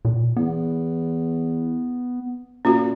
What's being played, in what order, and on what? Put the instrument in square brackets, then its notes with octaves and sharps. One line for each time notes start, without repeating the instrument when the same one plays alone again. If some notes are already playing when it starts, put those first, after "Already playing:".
[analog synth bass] A#2
[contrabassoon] E2 [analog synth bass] B3
[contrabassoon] A#2 [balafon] C#4 F4 F#4